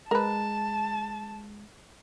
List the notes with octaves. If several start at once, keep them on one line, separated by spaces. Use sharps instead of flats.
G#3 A#4 B4 A5